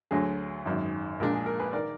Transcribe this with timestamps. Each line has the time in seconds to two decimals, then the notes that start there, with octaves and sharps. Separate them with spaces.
0.11 D2 D3 F#3 G#4
0.65 G#1 F#2 D#3
1.19 A#1 A#2 G#3 D4 A#4
1.33 G#4
1.46 A#4
1.59 G#4 B4
1.73 D#3 A#4 D5